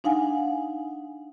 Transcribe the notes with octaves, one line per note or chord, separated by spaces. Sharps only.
D4 D#4 F5 F#5 G#5